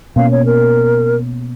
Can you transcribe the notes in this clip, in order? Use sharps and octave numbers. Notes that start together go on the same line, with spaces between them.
B2 A#3 C#4 F5
C#5
A#4